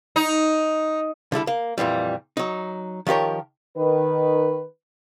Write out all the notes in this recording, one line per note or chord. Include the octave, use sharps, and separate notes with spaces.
D#4
D3 G3 E4 A4
A#3
F2 A#2 E3 G3
F#3 D#4
D#3 F3 G4 A#4 C#5
D#3 B4